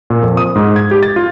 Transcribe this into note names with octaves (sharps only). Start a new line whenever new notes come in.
A#2
F2
D#6
G#2
G#6
G4
A6
F4